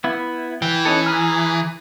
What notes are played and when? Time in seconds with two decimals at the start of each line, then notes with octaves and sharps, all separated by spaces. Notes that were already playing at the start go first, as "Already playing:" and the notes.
0.04 B3 E4
0.62 E3 G5
0.85 C#4 D#4 A4
1.06 G#4 A#5 F6